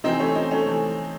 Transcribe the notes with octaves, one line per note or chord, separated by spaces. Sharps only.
C3 E3 C4 D#4
A3 C#4
C4 D#4
A3 C#4
C3 E3 A3